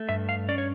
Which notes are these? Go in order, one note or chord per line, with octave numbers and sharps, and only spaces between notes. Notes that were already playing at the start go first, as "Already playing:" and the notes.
Already playing: A3
G2 E5
F5
C#4 D5
C#5